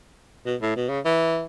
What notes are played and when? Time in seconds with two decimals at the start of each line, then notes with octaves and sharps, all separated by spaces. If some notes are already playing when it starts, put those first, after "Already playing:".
0.46 B2
0.61 A2
0.76 B2
0.89 C#3
1.05 E3